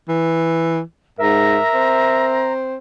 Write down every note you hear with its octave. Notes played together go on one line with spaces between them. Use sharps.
E3
G#2 A#4 E5 A#5
C4